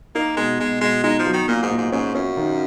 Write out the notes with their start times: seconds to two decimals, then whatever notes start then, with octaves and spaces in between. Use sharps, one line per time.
0.15 A#3 D#4
0.37 B2 G#3
0.59 B2 G#3
0.81 B2 G#3
1.04 G#3 D#4
1.19 F3
1.26 F#3
1.33 D#3
1.48 A#2 A#3
1.63 G#2
1.70 A#2
1.78 G#2
1.92 G#2 C#4
2.15 F#2 C#4
2.37 D#3